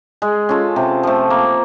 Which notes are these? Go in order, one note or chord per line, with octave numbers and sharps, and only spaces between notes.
G#3
C#4 F4 A4
C3
F3 A3
A#3